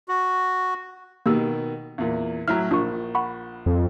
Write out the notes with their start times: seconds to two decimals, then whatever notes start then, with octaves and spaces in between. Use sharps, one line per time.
0.09 F#4
1.26 B2 D#3 A#3 G4 E6
1.98 E2 A#2
2.48 A2 F#3 E4 A#5 F6
2.71 A#1 D4 F4 C#6
3.15 F#5 B5 C#6
3.66 F2